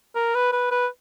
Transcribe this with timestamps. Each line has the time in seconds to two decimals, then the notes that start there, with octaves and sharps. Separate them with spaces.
0.15 A#4
0.34 B4
0.53 B4
0.71 B4